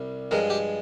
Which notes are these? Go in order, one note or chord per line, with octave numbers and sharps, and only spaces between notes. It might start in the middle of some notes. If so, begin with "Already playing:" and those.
Already playing: C2 C3 G3
G2 F3 G#3 A#4
G4